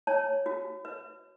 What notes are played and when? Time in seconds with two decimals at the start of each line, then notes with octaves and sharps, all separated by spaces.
0.07 C#5 A5
0.46 F#4
0.85 B4